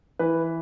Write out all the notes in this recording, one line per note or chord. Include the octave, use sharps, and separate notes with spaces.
E3 B4